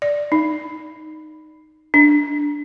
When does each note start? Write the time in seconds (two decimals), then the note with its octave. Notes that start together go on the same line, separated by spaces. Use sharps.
0.02 D5
0.32 D#4
1.94 D4